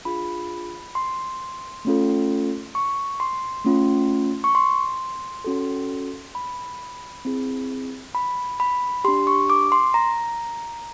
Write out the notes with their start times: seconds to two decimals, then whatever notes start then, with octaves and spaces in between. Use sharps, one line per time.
0.05 D4 F4 G#4 B5
0.95 C6
1.85 A3 C#4 F4 A4
2.75 C#6
3.20 C6
3.65 A3 C#4 F4
4.44 C#6
4.55 C6
5.44 C#4 F#4 A4
6.35 B5
7.25 C4 E4 G#4
8.15 B5
8.60 B5
9.04 D4 G4 C6
9.27 C#6
9.50 D6
9.72 C6
9.94 A#5